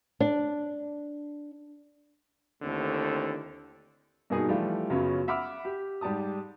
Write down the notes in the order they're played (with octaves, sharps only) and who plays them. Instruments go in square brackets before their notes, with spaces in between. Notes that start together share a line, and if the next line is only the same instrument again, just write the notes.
[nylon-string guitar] D4
[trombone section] D#2 D3 A3 C4 E4
[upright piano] G2 B2 A#3 D#4 G#4 D#6
E3 F3 G3 A3 F4
F#2 C#3 F#3 B3 C#4 F4
E5 F#5 B5 D6 F6
G4
G#2 G3 G4 A5 D#6